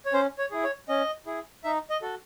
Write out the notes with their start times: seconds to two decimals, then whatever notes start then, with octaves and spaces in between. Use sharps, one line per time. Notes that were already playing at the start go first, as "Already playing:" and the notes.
0.06 C#5
0.13 C#4 C5
0.38 C#5
0.51 E4 G#4
0.64 C#5
0.89 C#4 D#5
1.26 E4 G#4
1.64 D#4 E5
1.90 D#5
2.02 F#4 A4